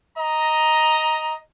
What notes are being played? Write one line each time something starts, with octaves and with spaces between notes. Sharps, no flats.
D#5 A#5